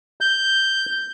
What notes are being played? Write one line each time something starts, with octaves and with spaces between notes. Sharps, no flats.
G6